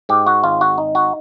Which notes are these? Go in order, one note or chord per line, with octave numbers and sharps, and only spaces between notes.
G#2 G4
F#4
G#1 F4
F#4
D#4
F#4